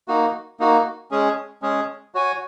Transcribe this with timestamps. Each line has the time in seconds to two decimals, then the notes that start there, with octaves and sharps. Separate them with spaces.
0.08 A#3 D#4 F#4
0.60 A#3 D#4 F#4
1.11 G#3 C#4 G#4
1.62 G#3 C#4 G#4
2.15 F#4 C#5 G#5